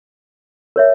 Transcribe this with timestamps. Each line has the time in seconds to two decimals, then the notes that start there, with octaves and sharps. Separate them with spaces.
0.76 A#4 C#5 E5